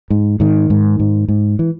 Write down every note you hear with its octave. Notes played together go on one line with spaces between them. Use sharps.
G#2
G#2 D#3
G#2
G#2
G#2
E3